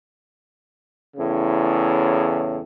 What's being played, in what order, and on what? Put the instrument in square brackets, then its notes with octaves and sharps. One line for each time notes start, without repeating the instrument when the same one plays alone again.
[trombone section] E2 A2 C#3